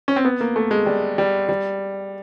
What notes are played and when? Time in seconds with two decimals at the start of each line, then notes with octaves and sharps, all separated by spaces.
0.08 C#4
0.16 C4
0.25 B3
0.41 A#3
0.56 A3
0.71 G#3
0.86 G3
1.18 G3
1.49 G3